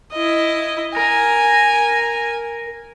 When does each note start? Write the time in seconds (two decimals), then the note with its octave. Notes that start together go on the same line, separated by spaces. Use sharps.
0.13 E4 D#5
0.96 A#4 G#5